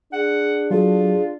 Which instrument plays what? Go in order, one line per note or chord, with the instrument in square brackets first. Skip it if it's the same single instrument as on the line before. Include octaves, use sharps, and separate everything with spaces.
[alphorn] D4 [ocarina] G#4 [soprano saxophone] F#5
[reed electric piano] F#3 A4 [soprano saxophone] F4 [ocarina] G#4